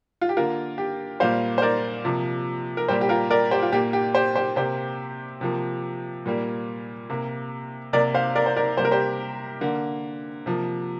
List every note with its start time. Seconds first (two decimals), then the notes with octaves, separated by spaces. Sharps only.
0.21 F4
0.29 G4
0.37 D3 A#3 F4 A#4
0.78 G4
1.20 A#2 G3 A#3 C5 F5
1.58 C5
1.62 A#4 D5
2.05 C3 F3 A#3
2.77 A#4
2.88 A#2 G3 A#3 G4 C5
3.01 G4
3.09 F4 A#4
3.31 A#4 D5
3.51 G4 C5
3.62 F4
3.72 A#2 A#3 G4
3.93 G4
4.15 G4 C5
4.36 G4 C5
4.56 C3 A#3 G4 C5
5.41 C3 F3 A#3
6.26 A#2 G3 A#3
7.10 C3 A#3
7.93 C3 A#3 A#4 D5
8.14 C5 F5
8.36 A#4 D5
8.46 C5
8.57 A#4 D5
8.77 C3 G3 A#3 C5
8.85 A#4
8.91 G4 C5
9.61 D3 A#3
10.46 C3 F3 A#3